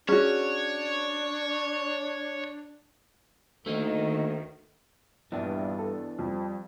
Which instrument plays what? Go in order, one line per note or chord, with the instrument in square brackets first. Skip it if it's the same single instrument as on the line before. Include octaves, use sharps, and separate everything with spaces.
[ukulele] C#4 F#4 [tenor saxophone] D4 [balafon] G#4 [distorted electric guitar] C#5
[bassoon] D2 [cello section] D#3 [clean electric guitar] A3 A#3 D#4
[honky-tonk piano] A#1 [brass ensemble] G2 [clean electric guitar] E3 B3 D4
[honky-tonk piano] A4
[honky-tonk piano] F2 [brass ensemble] F3 G3